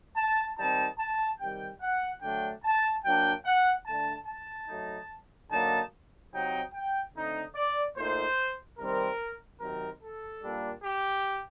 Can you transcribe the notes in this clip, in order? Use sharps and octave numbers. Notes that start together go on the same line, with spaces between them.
A5
D#3 G3 C4 D#4 A5
A5
C3 D#3 G3 G5
F#5
D3 F#3 A3 D4 G5
A5
F#3 A#3 D4 G5
F#5
D3 A3 D4 A5
A5
F#3 A3 D#4
D3 F#3 A#3 D#4 A5
C3 F#3 C4 D#4 G5
G5
D3 A3 C4 D#4
D5
A#2 A3 D#4 C5
C3 D#3 G3 C4 A#4
C3 D#3 F#3 C4 A#4
A4
A#2 G3 A#3 D4
G4